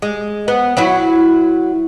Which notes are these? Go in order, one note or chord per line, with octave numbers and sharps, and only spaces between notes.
G#3
B3
F#3 E4 F#4